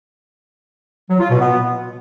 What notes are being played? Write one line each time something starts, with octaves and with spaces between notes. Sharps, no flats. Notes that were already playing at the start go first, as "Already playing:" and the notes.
F#3
F4
B2
B3